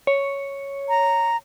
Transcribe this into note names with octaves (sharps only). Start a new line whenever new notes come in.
C#5
A#5